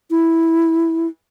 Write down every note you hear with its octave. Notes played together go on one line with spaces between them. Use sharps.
E4